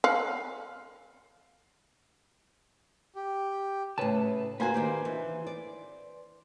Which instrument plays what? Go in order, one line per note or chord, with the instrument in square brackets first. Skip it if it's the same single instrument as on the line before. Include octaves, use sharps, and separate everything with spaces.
[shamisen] F5 F#5
[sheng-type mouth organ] G4
[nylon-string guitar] A2 C#3 [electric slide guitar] B4 A5
[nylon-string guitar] A#3 F#4 [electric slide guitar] B4 C5 G#5
[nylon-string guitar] D#3 D4 G4
E3
D5